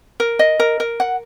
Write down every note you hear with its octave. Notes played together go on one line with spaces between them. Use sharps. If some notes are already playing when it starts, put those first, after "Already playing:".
A#4
D#5
A#4
A#4
F#5